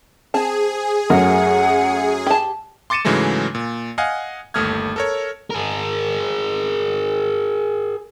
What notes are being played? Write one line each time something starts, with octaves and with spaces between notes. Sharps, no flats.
C4 G#4 A5
F#2 F#3 A3 A#4 F#5
G4 A5
C6 D6 A6 C#7 D#7 E7
G#2 C#3 E3 F#3 G#3 A3
A#2
D#5 F5 F#5 G#5
G1 D#2 A3 D#6 F6 G#6
A4 A#4 C#5
G#4 A#4